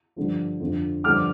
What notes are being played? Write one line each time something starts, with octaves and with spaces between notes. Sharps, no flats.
G2 D3 F3
F2 D3 F3
G2 D3 F3 D6 F6